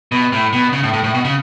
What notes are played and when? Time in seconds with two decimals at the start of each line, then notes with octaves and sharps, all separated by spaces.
0.12 B2
0.32 A2
0.53 B2
0.73 C#3
0.83 A2
0.93 A2
1.04 A2
1.14 B2
1.25 C#3